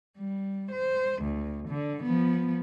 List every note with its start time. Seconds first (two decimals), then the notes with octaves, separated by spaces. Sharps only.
0.18 G3
0.72 C5
1.22 D2
1.69 D3
2.03 F3 B3